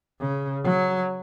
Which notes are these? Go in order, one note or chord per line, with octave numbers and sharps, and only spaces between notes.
C#3
F#3